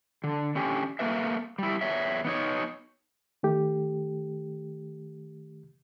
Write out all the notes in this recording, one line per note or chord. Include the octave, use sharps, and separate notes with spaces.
D3
D3 C#4 G4
A3 A#3 A#4 B4 E5
G3 E4
E2 C#5 E5
B3 D#4 C#5
D#3 A3 G4